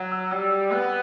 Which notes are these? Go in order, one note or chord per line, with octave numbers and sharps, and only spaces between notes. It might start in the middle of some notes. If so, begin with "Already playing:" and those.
Already playing: F#3
E6
G3 E6
B3 E6